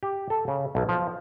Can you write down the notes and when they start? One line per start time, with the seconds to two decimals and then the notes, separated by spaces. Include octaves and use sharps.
0.03 G4
0.30 A4
0.48 C#3
0.75 B1
0.89 F3